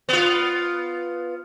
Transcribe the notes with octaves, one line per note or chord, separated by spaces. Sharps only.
B3 F4